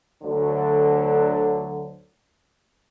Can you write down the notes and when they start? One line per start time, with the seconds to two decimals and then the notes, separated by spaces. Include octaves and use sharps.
0.23 D2 D3 F#3